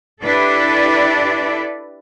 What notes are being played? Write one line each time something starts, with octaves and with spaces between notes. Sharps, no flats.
D4 E4 G4 A4 B4 D5